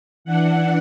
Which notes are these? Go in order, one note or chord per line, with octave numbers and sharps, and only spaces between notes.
E3 D4 F#5